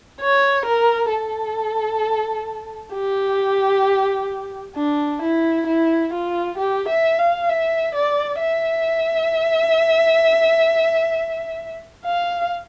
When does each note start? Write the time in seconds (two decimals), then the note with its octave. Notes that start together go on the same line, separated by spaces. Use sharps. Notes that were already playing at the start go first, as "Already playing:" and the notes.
0.21 C#5
0.66 A#4
1.12 A4
2.94 G4
4.76 D4
5.22 E4
5.67 E4
6.13 F4
6.58 G4
6.89 E5
7.19 F5
7.49 E5
7.95 D5
8.40 E5
12.05 F5